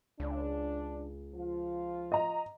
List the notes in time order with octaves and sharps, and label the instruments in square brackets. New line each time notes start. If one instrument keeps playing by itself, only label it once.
[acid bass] C#2 [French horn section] D4
[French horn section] F3 F4
[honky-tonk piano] D#5 A#5